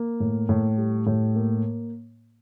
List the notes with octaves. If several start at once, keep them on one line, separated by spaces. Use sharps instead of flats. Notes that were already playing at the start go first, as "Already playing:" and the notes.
Already playing: A#3
A2
A2
G3
A2
A#3